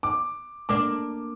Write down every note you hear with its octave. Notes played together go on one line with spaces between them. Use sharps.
D6
A#3 D4 D6